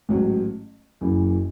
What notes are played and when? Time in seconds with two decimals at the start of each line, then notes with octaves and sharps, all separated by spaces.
0.09 A1 G#2 F#3
1.01 F#1 F#2 E3